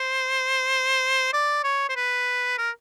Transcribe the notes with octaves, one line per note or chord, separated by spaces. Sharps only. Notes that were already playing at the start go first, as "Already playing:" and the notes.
Already playing: C5
D5
C#5
C5
B4
A#4